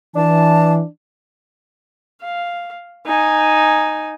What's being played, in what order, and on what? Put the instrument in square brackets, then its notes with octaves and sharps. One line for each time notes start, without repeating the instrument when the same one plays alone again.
[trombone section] E3 [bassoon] D4 [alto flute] A5
[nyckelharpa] F5
D#4 G#5